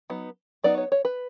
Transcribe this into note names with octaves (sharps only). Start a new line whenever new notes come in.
F#3 B3 D#4
F#3 B3 D#4 D5
C#5
C#5
B4